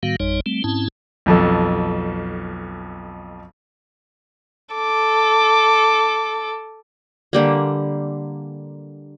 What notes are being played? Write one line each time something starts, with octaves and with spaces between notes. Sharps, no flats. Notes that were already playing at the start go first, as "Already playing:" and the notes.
A2 D#3 G3 B3 F#4 F5
G#1 F2 G3 D#4 C#5
G3 A3 C4
G#2 C4 C#4 E4 A5
B1 F2 A4
A4 D6
D3 G3 A#3